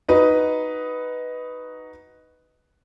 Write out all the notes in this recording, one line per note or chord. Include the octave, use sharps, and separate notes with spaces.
D#4 F#4 B4 D#5